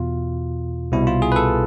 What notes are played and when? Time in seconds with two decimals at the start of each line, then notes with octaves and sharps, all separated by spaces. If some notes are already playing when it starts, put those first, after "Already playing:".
Already playing: E2 B2 F4
0.92 C2 B2 E4
1.07 F4
1.22 G#4
1.32 B4
1.36 A4